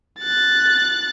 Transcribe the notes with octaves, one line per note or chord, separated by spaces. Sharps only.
F#6 A6